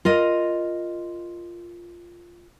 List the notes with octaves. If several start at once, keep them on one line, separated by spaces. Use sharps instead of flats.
F4 A#4 D#5